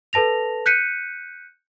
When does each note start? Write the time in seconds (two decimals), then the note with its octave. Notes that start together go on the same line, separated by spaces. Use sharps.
0.13 A4 B4 A5 A#6 F7
0.66 F#6 G6 B6 C#7 D#7